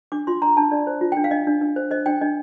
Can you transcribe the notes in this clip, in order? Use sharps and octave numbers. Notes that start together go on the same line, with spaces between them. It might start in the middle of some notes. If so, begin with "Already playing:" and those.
D4 D6
F4 C6
D4 A#5
D4 A5
D4 D5
C5
F4
G5
D4
F5
D4 D#5
D4
D4
C5
C5 D#5
D4 G5
D4 D#5